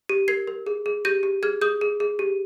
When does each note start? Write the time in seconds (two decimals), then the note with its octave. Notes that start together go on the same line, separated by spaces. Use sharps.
0.09 G4
0.28 A#4 G#6 C7
0.47 A#4
0.67 G#4
0.86 G#4
1.05 G4 G6 A#6
1.23 G4
1.43 G#4 F6 G#6
1.61 G#4 D#6 G6
1.81 G#4
2.00 G#4
2.19 G4